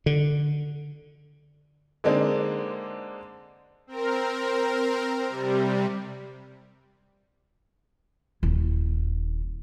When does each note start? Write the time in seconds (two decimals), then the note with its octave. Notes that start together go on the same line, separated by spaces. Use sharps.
0.06 D3
2.04 D3 G#3 A#3 C4 D4 D#4
3.87 C4 A#4
5.29 C3 G3
8.43 D#1 E4